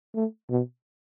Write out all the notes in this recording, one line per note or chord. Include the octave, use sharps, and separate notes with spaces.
A3
B2